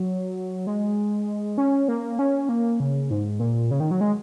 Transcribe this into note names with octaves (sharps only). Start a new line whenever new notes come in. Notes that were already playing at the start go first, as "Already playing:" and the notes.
Already playing: F#3
G#3
C#4
A#3
C#4
A#3
C#3
G#2
A#2
C#3
D#3
F#3
G#3